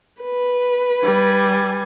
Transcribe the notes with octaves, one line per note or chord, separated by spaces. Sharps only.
B4
G3 G#5